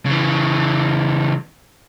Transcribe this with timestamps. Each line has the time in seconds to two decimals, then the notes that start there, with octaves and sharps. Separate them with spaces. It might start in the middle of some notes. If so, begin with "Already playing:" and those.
0.06 C#3 E3